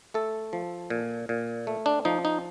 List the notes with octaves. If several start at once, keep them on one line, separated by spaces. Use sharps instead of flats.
A3 A4
F3
A#2
A#2
A3
D4
F3 D#4
D#4